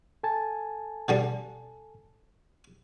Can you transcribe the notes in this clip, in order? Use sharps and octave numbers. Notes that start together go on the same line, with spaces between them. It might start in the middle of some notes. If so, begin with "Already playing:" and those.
A4 G#5 A5
B2 D3 G3